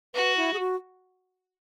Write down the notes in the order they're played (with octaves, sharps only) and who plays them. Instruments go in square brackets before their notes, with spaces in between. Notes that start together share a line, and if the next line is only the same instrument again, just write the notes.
[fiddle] F#4 [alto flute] B4
[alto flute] E4
G#4
F#4